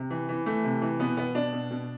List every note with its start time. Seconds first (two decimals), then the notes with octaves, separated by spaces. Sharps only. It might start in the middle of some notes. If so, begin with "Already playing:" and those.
Already playing: C3
0.10 E3
0.29 E3
0.46 E3 A3
0.64 C3
0.82 E3
0.99 B2 B3
1.17 B2 B3
1.35 B2 D4
1.53 B2
1.71 B2